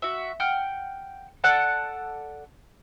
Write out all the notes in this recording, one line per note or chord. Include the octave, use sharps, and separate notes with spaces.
F#4 E5
F#5 G5 F6
A4 D5 F#5 A5